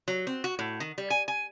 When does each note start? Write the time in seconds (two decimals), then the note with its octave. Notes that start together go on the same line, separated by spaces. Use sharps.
0.08 F#3
0.27 C4
0.44 F#4
0.59 A2
0.80 D#3
0.98 G3
1.10 G#5
1.28 G#5